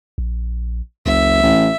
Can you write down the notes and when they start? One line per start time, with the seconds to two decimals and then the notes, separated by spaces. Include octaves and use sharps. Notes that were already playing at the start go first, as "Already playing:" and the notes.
0.18 A#1
1.06 F#1 C#2 E5
1.43 A1